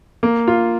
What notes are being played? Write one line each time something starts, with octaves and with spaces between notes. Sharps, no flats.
A#3
F4